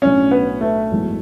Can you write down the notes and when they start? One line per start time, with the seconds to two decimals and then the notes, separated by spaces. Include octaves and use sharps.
0.02 B1 A2 F#3 A3 C#4 D4
0.31 B3
0.61 A3
0.91 G#1 F#2 E3 G#3 B3